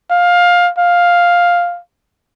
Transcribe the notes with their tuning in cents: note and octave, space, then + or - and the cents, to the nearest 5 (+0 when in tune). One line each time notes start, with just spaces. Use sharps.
F5 +15
F5 +5